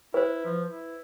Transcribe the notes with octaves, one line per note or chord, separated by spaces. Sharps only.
E4 B4 C5
F3
E4